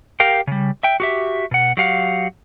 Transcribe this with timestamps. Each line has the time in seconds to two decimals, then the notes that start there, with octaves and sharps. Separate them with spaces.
0.20 G4 A#4 F5 G5
0.47 C#3 G3
0.83 E5 G5
1.00 F#4 G4 E5
1.51 B2 F#5
1.77 F#3 G4 F5 F#5